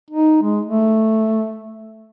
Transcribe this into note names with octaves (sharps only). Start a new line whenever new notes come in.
D#4
G#3
A3